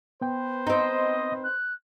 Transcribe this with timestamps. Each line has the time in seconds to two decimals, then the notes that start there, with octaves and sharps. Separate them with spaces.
0.21 B3 B4 C5 G5
0.67 C4 D#4 D#5
1.43 F#6